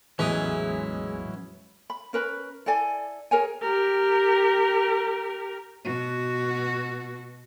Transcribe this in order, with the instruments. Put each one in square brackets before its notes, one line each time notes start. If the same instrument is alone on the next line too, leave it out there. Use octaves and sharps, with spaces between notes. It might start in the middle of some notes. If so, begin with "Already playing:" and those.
[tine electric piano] A1 E2 D#6 [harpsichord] E3 [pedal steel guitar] F#3 C#4 E4 [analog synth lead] G#3
[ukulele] B5
C#4 A#4 B4 B5
E4 A4 D5 G#5
G#4 A#4 C#5 G#5
[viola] G4 A#4
[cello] B2 F#4